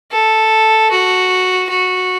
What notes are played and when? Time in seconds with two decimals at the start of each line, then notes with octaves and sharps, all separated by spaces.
0.12 A4
0.91 F#4
1.70 F#4